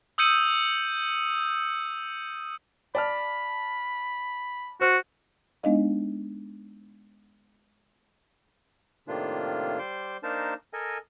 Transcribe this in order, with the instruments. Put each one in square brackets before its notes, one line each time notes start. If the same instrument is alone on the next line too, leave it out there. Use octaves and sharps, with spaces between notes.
[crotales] D#6 E6 G6 C#7 D#7 F#7
[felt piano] D5 A5 F6 [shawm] B5
[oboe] F#4 [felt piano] C5 F6
[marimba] G#3 B3 D4 D#4 D#5 F5
[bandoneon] A2 C3 D#3 A#3 D4 F4
G3 C5 C6 D6
A#3 D4 D#4 A#4 C5 A5
A4 A#4 D#5 G#5